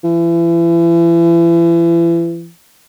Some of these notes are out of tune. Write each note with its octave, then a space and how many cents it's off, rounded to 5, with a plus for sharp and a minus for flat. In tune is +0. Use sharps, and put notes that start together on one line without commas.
E3 +35